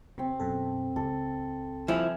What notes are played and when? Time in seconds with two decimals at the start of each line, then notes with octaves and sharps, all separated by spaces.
0.18 C3 C4 C#6
0.40 F#2 B2 A4
0.96 C#2 A4
1.88 F3 E4 G#5